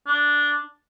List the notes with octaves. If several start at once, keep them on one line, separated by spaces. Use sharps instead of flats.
D4